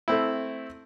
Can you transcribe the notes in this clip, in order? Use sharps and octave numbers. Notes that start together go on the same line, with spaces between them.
A3 C4 E4